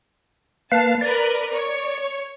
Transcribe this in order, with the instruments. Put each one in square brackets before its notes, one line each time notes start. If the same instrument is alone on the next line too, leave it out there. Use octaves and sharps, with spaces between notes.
[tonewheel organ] A#3 B4 F5 [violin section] A5
[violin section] A#4 B4 [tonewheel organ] D5
[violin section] C#5